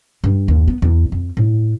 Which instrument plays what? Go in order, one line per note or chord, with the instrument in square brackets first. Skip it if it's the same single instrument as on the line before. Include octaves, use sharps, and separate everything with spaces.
[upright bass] G2
D#2
B3
E2
F2
A2